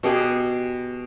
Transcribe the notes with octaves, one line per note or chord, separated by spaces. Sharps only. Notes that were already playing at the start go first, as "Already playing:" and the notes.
B2 G4 G#4 B4